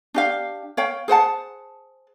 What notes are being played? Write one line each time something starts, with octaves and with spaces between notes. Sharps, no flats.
D4 G4 F5
C#5 F5 G5
G#4 C5 F#5 A5